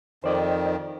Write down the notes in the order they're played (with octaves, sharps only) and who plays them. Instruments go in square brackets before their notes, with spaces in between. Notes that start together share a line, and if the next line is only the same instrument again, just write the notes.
[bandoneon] F2 D#3 [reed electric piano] C5 D5 D#5